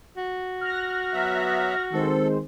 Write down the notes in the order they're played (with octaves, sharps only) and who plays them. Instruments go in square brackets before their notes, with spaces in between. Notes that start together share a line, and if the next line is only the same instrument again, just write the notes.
[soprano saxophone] F#4
[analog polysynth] F6 F#6 A#6
[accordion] F#3 B3 E5
[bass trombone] D#3 [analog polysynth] G#3 C4 C5 [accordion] A4